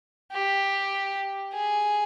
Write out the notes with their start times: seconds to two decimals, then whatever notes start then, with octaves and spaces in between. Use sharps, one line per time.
0.33 G4
1.54 G#4